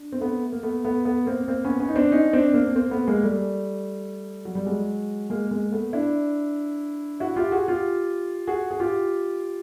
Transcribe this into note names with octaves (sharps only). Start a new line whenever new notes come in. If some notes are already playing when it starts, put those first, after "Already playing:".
Already playing: D4
C4
A3 B3
A#3
A3 B3
A3 B3
A3 B3
A#3 C4
A#3 C4
B3 C#4
B3 C#4
D#4
C4 D4
C#4 D#4
C4 D4
A#3 C4
A#3 C4
A3 B3
G#3 A#3
G3 A3
F#3
G3
F#3 G#3
G#3 A#3
G#3 A#3
A3 B3
D4 E4
E4 F#4
F4 G4
F#4 G#4
F4 G4
F#4 G#4
G#4
F4 G4